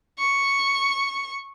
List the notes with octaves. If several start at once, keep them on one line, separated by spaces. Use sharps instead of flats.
C#6